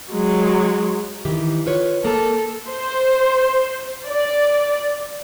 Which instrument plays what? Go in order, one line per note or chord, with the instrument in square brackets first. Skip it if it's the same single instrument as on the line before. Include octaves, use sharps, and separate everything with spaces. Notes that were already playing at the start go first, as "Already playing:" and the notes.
[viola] F#3 G#3
[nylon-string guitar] D#3 E3 G4
F4 B4 C#5
[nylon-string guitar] A#3 A#4 [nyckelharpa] A4
[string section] C5
D5